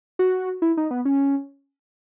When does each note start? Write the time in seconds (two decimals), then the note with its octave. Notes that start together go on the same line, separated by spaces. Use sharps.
0.19 F#4
0.62 E4
0.77 D#4
0.91 B3
1.05 C#4